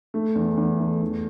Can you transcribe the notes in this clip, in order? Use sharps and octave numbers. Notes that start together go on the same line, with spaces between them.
A3
E2
E2
A3
E2